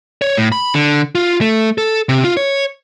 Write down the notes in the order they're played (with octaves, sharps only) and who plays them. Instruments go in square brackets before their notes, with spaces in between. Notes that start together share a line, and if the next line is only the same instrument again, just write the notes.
[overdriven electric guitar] C#5
A2
B5
D3
F4
A3
A4
C3
F4
C#5